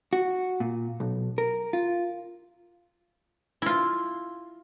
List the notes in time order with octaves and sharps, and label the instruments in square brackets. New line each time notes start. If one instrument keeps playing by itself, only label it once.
[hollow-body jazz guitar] F#4
A#2
B1
A#4
F4
[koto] E4 F4